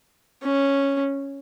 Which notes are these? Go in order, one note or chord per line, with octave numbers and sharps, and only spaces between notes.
C#4